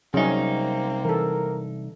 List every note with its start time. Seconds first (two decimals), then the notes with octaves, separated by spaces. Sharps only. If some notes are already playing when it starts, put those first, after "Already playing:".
0.14 C2 F#3 A#3 C4 C#4 D#4 G#4
1.05 E3 A4 A#4